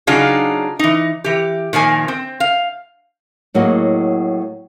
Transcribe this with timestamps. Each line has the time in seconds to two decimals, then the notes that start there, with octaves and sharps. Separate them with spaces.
0.07 C#3 F#3 D4 D#4 F4 G#4
0.79 E3 D#4
1.24 E3 G4
1.73 A#2 D#3 F3 G#5
2.08 C4
2.40 F5
3.54 A2 F#3 A#3 F#4 G#4 D#5